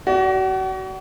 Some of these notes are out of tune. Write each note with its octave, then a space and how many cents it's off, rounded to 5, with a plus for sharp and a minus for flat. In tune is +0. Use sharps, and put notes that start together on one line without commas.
F#4 +35 D5 -25